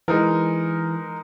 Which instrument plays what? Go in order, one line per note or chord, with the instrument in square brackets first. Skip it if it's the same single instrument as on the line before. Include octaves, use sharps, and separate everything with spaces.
[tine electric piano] E3 [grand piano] G#3 D#4 A#4